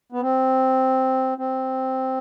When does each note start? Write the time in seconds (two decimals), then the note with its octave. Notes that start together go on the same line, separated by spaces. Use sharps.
0.12 B3
0.21 C4
1.38 C4